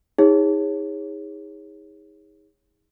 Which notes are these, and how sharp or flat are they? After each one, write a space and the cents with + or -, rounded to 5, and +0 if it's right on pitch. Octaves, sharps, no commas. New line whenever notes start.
D#4 +35 G#4 -30 C#5 -15